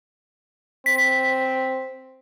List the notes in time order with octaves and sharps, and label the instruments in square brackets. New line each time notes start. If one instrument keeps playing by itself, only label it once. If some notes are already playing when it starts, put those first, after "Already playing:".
[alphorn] C4 [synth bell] B6